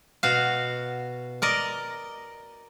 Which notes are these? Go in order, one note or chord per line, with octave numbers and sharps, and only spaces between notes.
B2 F#4 F5
A#4 D5 D#5